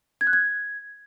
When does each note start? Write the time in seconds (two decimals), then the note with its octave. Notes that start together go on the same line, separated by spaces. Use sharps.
0.21 G#6
0.27 F#6
0.33 G#6